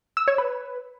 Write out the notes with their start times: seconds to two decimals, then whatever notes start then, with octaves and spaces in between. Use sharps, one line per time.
0.17 E6
0.28 C#5
0.38 B4